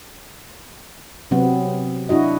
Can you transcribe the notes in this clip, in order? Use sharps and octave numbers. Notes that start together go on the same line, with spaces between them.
C3 F#3 B3 C4
D4 E4 F#4 D#5